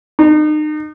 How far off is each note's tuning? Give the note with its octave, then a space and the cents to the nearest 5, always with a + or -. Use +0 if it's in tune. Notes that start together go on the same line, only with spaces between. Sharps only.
D#4 -35